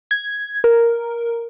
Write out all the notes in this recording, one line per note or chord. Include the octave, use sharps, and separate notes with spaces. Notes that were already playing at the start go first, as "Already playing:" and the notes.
G#6
A#4